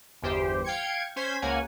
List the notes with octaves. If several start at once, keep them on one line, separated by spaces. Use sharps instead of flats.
G1 E2 G4 C5
F5 G5 G#6 C#7
C#4 C5 G#6 B6
C#2 A#3 C#5 F#5 G#5